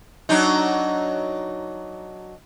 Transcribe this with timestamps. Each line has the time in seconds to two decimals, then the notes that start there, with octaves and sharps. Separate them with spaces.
0.29 F#3 D4 D#4